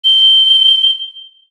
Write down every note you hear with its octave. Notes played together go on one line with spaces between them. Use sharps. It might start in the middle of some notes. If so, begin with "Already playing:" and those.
G7